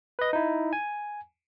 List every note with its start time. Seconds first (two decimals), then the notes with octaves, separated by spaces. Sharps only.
0.19 B4 D#5
0.33 D#4 E4
0.73 G#5